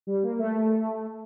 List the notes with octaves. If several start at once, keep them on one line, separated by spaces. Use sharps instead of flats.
G3
A#3
A3